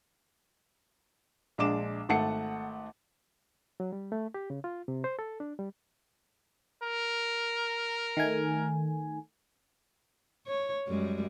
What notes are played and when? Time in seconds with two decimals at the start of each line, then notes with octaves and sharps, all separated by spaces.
1.58 A#1 G#3 D4 D6 E7
2.09 G#1 A3 F#5 A5 C#7
3.80 F#3
3.93 G3
4.12 A3
4.34 G4
4.50 C#3
4.64 F4
4.88 C3
5.04 C5
5.19 A4
5.40 D4
5.59 G3
6.83 A#4
8.17 D#3 A3 G#5
10.47 C#5
10.88 F#2 G3 G#3